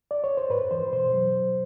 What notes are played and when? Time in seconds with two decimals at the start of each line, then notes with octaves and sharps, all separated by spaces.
0.11 D5
0.24 C#5
0.37 C5
0.50 G#2 B4
0.71 E3 C5
0.93 B2 C5
1.14 F#3